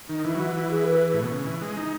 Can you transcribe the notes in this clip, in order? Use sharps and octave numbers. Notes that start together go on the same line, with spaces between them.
D#3 D#4
E3 E4
F#3
E3 F#4
F#4
G#4
B4
A2
B2
C#3
E3
G#3
D#4